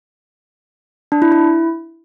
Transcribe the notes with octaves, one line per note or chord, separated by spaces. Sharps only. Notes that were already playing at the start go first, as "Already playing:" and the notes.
D4
E4
E4